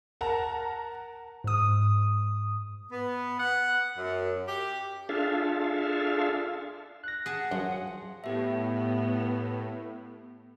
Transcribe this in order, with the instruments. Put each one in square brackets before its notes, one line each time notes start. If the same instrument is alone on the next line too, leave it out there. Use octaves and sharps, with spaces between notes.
[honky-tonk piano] A#4 F#5 A5 A#5
[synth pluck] G#2 D#6
[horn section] B3
F#5
F#2
G4
[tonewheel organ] D4 F4 G#4 A4 E5 F5
[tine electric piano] F#6 A#6
[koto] G#4 A5 [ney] F#5
[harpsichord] F#2 [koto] F3
[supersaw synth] A2 [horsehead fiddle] B3 [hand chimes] G4 E5